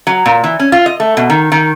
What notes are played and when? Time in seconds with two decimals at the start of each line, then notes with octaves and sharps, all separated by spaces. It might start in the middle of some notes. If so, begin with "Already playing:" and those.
0.07 F#3
0.26 A#2
0.44 E3
0.60 C#4
0.72 F4
0.86 D#5
1.00 A3
1.17 B2
1.30 D#3
1.52 D#3